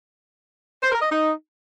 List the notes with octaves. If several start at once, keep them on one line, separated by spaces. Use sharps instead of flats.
C5
A#4
D#5
D#4